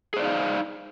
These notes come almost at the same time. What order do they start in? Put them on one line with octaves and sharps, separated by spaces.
G#4 C5 D5 D#4 F5